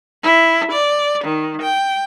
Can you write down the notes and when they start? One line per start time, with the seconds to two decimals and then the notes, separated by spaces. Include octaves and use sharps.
0.23 E4
0.71 D5
1.24 D#3
1.62 G5